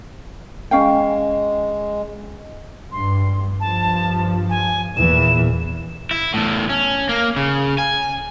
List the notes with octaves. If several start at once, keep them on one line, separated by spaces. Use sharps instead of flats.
G#3 C#4 F5 G5
G2 C6
G2 F3 A5
G#5
E2 A#2 E3 E7
E4
E2 A2
C#4
A#3
C#3
G#5